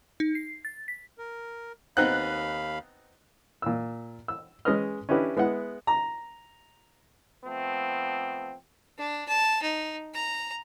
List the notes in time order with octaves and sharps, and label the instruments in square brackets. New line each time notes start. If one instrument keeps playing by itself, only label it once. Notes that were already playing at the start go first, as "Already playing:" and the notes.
[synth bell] D#4
C7
A6
B6
[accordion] A#4
[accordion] D#2 F5 B5 [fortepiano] B3 C4 D#4 [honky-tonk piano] F#6
[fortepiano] A#2 E6
E6
G#3 C#4 B4 D#5 F6
C#4 D4 E4 G4 B4 D#5
G#3 B3 E4 F#5
A#5
[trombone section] F3 A3 B3 C4
[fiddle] D4
A5
D#4
A#5